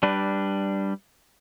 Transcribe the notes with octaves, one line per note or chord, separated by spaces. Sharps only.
G3 D4 B4